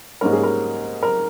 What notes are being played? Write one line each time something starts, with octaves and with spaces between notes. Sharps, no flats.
G#2 G3 A#3 C#4 A#4
G#4
A#4
A#4